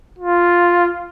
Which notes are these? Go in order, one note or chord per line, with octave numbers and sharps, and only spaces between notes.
F4